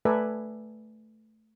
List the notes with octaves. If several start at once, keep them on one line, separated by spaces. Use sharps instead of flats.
A3 A4 B4 D5 E5 G#5